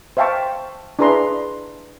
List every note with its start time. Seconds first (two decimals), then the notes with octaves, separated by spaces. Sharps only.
0.17 C5 E5 F5 G5 A5 C#6
0.99 D4 E4 G#4 B4 A#5 C6